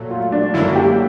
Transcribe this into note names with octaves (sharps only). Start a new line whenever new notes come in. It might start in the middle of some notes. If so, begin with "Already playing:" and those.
Already playing: A#2 F#3 A3
F4
D4
F#2 D3 F#3 A#3 D4 E4
G4